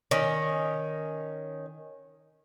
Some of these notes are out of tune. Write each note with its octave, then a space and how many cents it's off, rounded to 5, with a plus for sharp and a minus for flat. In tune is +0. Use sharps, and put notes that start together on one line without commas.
D#3 +0 C#4 +0